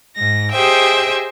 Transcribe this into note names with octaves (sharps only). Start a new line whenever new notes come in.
G#2 A#6
G4 G#4 C5 D#5 E5 G5